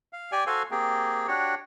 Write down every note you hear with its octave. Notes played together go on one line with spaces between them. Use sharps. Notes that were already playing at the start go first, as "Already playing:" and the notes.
F5
G4 D5 G#5
F#4 A4 C5 F5 G#5
A#3 C4 G4 G#4
D4 F#4 G4 C#5